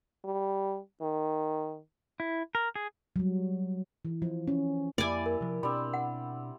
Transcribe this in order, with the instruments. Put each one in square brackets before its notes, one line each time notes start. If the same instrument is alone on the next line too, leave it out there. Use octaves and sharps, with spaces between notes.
[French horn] G3
D#3
[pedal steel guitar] E4
A#4
G#4
[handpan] F#3 G3
E3
F3
C#4
[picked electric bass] F2 A#3 [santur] G3 E4 [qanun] D5 G#5
[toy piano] A#4
[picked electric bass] C3 F3
[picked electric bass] B2 D4 [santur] G3 C4 [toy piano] B5
[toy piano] F#5